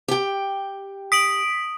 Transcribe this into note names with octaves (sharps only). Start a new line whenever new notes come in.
G4 G5
D#6 B6 D7 F#7